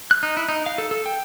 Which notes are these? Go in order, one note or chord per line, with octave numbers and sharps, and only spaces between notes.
F#6
D#4
E4
D#4
F5
A4
A4
G5